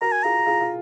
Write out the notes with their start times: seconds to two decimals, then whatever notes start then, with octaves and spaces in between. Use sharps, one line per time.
0.01 F#4 A#4 A#5
0.12 G#5
0.23 F4 G#4 A#5
0.46 F4 G#4
0.61 F4